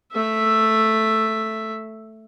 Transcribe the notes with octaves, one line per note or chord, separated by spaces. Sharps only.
A3 E5